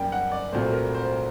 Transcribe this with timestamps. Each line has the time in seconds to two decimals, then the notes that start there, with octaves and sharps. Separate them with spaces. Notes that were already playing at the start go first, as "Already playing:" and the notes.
Already playing: F#2 G3 A#3 G5
0.12 F#5
0.32 D5
0.52 C2 A#2 F#3 A3 C5
0.73 A#4
0.94 C5